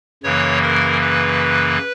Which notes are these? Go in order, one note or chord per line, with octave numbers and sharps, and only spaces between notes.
F#2 C#3 E3 A#3 C#5
A#4
B4